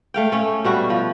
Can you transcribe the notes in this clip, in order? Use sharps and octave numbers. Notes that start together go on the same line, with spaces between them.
A3 F5 G5
A3 C#4
B2 G3 F#4
F3